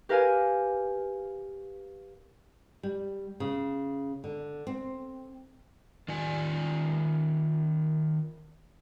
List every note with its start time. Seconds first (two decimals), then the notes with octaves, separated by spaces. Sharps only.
0.09 G4 A#4 B4 F5 G#5
2.83 G3
3.40 C#3
4.24 D3
4.67 C4
6.08 D#3 F4 D5 G#5